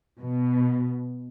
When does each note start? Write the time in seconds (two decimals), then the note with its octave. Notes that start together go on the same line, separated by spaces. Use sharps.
0.20 B2